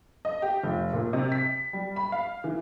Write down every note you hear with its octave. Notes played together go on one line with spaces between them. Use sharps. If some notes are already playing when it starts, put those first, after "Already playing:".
D#5
G4
F1
A#2
C3
B6
G3
B5
F5
E3